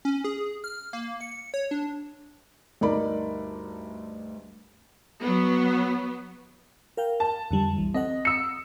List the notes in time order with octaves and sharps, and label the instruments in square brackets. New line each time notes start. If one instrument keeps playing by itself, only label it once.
[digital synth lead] C#4
G#4
F6
A#3
C#7
C#5
D4
[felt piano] D2 G2 D#4 A#4 D5 B5
[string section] F#3 B3
[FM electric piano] A#4 F5 G5
[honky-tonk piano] A5
[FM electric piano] F2 D3 G3
B1 E3
[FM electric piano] C4 A4 F#5 [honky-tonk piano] D#5
[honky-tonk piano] D#6 E6 C#7